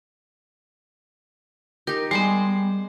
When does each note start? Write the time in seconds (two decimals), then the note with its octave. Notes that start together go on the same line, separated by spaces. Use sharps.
1.87 D#4 G4 A#4
2.11 G3 G#3 B3 D5 C6